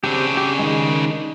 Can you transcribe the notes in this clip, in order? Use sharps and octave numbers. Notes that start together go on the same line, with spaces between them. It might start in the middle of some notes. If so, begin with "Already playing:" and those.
C#3 C4 D4 G4
G4
D#3 G#3